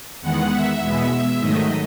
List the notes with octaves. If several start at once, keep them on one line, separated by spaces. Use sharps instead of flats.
E2 D#3 G#3 B3 F#5
E5
E2 B2 G#3 B3
G#2 D#3 F#3 A3 D#5